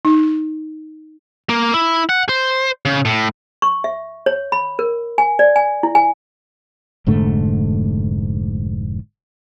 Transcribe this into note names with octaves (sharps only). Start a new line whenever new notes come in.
D#4
A#3
E4
F#5
C5
C#3
A2
C#6
E5
C#5
B5
A#4
G#5
D5
G#5
E4
G#5
F1 G#2 D3 A3